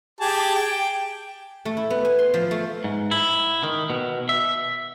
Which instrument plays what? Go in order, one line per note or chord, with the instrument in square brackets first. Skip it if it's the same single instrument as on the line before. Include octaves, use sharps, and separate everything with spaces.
[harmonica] G4 G#4 A5
G5
[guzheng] A3
E4
B3
G#5
C6
F3
A3
[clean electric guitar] G#2
E4
D#3
B2
E5